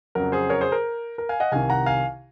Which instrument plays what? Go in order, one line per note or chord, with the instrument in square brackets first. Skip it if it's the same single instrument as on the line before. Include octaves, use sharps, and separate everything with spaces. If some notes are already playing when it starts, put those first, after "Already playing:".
[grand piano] F2 C#3 F#3 A#4
G#4 C5
A#4 C#5
G#4 C5
A#4
A#4
F5 G#5
D#5 F#5
C2 C3 D#3 F5 G#5
F#5 A#5
F5 G#5